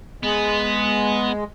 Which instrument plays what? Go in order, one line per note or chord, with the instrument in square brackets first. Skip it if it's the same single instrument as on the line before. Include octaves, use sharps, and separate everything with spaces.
[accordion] G#3 [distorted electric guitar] B3